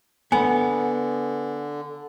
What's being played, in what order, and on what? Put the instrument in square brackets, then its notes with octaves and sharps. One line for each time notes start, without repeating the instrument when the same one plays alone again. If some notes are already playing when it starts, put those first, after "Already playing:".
[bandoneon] D3 [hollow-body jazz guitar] B3 [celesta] G#5